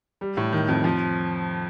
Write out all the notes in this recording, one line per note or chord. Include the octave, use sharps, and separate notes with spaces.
G3
A2
D#3
F2
F3